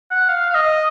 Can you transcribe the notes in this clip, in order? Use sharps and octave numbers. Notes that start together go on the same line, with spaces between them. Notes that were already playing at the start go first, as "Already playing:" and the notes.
F#5
F5
F5
D#5